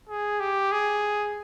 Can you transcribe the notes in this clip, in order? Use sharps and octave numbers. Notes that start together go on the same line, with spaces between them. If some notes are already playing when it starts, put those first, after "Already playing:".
G#4
G4
G#4